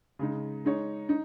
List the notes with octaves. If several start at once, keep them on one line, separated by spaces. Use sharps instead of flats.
C#3 G#3 D#4
G#3 D#4 C#5
D#4